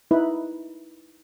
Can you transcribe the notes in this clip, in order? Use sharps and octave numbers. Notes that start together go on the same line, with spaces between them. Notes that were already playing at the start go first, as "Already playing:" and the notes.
D#4 E4 B4